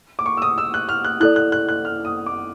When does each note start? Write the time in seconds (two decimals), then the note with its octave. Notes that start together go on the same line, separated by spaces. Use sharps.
0.19 D6
0.26 C#6
0.37 E6
0.42 D#6
0.58 E6
0.74 F#6
0.89 F6
1.04 F#6
1.20 E4 A4 D5 F#6
1.36 F#6
1.52 F#6
1.69 F#6
1.85 F6
2.05 D#6
2.26 D6